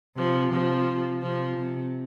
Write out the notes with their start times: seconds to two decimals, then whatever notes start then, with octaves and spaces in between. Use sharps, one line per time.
0.15 C3 F3
0.51 C3 F3
1.21 C3 F3
1.57 C3